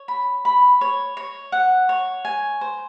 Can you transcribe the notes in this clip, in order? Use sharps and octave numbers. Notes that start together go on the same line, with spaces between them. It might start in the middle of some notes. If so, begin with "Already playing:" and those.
Already playing: C#5
B5
B5
C#5
C#5
F#5
C#5
G#5
C5